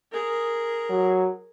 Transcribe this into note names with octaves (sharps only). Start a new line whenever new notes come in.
G#4 A#4
F#3